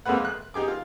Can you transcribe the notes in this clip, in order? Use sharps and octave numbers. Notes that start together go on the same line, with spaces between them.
F2 G#3 A#3 B4 F#5
F#6
D#4 G4 G#4 D6
F4